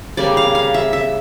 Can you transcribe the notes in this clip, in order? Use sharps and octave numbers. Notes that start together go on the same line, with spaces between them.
C#3 G3 A#3 D5
F5
F5
E5
E5